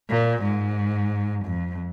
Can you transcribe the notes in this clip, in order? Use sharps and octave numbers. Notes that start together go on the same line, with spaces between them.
A#2
G#2
F2